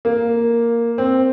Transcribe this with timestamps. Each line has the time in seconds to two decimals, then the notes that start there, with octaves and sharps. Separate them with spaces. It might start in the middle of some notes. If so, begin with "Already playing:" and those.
0.05 A#3
0.98 C4